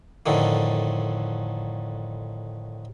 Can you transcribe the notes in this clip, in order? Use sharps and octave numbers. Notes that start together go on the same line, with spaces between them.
F2 A2 D3 D#3